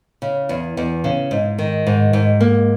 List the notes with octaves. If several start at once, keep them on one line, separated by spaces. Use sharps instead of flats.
C#3
E2
E2
C#3
G#2
D#3
G#2
G#2
A#3